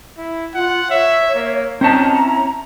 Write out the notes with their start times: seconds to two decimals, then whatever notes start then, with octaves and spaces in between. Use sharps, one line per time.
0.18 E4
0.55 F4 F#5
0.90 C#5 E5
1.35 A#3
1.81 C4 C#4 D#4 A5 A#5
2.19 E4